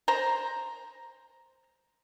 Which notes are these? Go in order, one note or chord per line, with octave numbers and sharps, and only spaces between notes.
C5 A#5